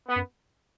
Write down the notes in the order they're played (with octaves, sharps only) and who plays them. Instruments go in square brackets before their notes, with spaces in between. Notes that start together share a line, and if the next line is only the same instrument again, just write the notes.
[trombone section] B3
[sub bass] F#2